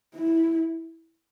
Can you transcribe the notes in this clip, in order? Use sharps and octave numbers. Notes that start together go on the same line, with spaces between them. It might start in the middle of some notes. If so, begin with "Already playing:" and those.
E4